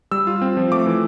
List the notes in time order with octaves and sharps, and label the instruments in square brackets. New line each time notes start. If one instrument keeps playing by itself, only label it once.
[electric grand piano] G3 E6
F4
C4
F3
A3 D6
E3